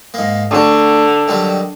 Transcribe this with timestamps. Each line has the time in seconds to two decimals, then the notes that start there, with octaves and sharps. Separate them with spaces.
0.14 G#2 A#3
0.51 D2 D3 F#4
1.28 D#3 F#3 G3